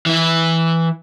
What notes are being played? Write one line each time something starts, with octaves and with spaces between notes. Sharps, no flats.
E3 E4